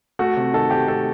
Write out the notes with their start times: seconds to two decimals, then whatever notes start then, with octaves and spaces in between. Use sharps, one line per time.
0.19 A3 F#4
0.36 C3
0.53 D#3 A4
0.71 C3 G4
0.88 A3 A4